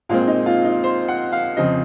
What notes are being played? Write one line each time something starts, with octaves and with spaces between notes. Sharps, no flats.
A#2 G#3 C4 F4
D#4
F4
D#4
C5
F#5
F5
F2 C#3 F3 C4 D#5